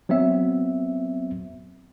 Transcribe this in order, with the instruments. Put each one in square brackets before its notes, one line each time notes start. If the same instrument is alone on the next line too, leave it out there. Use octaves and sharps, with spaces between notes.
[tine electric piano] F#3 B3 C4 E5